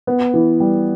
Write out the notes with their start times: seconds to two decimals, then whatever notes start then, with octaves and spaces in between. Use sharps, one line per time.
0.07 B3
0.34 E3
0.60 G3